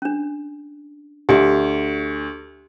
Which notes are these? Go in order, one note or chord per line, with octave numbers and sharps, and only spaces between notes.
C#4 D4
D2 G4 D#5